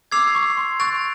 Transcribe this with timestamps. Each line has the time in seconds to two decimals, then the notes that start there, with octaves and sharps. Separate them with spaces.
0.12 D6 E6 G#6 C7 F7
0.35 C#6
0.57 C6
0.80 C#6 F#6 A6 D7 F7